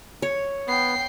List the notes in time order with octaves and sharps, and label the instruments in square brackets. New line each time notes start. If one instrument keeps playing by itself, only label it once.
[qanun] C#5
[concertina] B3 [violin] G5 C7